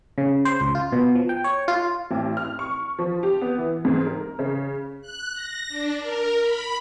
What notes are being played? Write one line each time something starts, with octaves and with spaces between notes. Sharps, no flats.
C#3
C5
C#2
F4
B2
F3
G5
C#5
F4
A1
F6
C#6
F3
G4
B3
E3
G#2
A#4
C#3
F#6
A#6
D4
A#4
B5